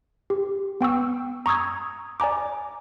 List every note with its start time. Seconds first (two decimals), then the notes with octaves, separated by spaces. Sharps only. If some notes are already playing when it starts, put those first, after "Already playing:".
0.30 G4
0.81 B3 G5 C#6 E6
1.46 A#5 C#6 D#6 E6 G#6
2.20 D5 G#5 A#5 D6